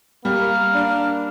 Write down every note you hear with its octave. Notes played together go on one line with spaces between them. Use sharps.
G3 A#3 F6
D4